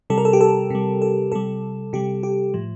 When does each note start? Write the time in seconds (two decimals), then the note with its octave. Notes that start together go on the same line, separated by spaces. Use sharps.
0.10 C3 G3 A4
0.18 A#4
0.25 A4
0.33 G4
0.41 A4
0.70 C3 G3
1.02 A4
1.32 C3 G3 A4
1.93 C3 G3 G4
2.23 G4
2.54 A2 F3